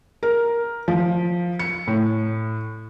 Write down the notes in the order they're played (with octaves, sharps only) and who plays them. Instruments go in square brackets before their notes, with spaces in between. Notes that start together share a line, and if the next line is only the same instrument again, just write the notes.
[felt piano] A#4
F3
C#7
A2